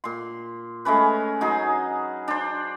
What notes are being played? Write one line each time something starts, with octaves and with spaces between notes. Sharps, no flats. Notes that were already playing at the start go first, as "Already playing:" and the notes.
A#2 C6
G#3 A3 C#4 B4
F#3 D#4 G#4
D4 C5